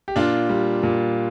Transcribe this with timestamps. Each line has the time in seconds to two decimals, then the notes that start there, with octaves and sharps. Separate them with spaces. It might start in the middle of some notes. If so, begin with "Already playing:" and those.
0.08 G4
0.16 A#2 D4 F4
0.49 G3
0.83 A#2